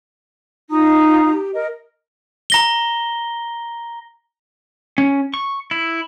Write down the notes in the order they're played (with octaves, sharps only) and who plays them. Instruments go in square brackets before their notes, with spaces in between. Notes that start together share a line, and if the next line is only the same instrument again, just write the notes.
[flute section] D#4 F4 A#5 D#6
G4
A#4 D#5
[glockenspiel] A#5 A#6 G7
[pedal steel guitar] C#4
C#6
E4